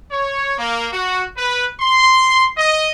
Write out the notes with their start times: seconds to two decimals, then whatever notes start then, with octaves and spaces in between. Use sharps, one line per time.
0.11 C#5
0.58 A#3
0.92 F#4
1.37 B4
1.80 C6
2.58 D#5